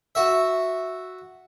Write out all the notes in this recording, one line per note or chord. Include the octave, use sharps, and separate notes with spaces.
F#4 E5